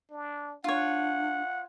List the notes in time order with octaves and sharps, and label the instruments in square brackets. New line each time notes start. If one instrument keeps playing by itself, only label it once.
[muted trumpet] D4
[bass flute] D4 [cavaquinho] F4 C#5 [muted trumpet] F#5